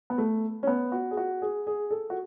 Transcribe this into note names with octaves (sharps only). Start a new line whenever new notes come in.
B3
A3
C#4
B3
F#4
G#4
F#4
G#4
G#4
A4
F#4